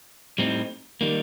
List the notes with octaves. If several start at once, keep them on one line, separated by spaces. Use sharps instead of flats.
A2 G3 C4 D#4
D#3 G3 A#3